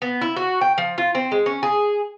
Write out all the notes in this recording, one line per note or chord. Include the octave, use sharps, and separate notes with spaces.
B3
E4
F#4
G5
F3
F4
C4
G#3
C#4
G#4